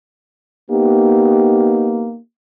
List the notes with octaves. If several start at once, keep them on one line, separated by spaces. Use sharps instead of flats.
A#3 B3 D#4 G4